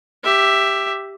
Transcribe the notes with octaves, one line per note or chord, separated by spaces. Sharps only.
G4 E5